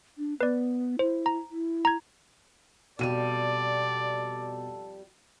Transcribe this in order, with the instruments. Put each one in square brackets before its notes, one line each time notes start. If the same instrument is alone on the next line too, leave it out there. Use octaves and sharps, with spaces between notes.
[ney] D4
[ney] B3 [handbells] B4 D5
[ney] E4 [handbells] C5
[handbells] A#5
[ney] E4
[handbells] A#5 G#6
[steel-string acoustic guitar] F2 G3 [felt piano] B2 D#7 [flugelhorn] A4 [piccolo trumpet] D5